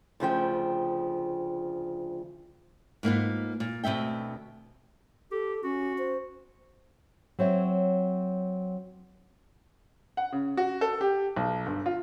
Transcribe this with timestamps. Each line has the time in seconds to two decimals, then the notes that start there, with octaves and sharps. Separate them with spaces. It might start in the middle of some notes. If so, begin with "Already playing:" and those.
0.20 D2 C#3 F3 G5
3.03 G#2 A#3 B3 F4
3.60 A#2
3.84 D2 B2 C4 E5 G5
5.32 G4 A4
5.63 C#4 F#4
5.98 C5
7.39 F#3 C4 C#5 E5
10.17 F#5
10.32 C#3
10.57 F#4
10.81 A4
11.01 G4
11.36 B1
11.66 G1
11.86 F4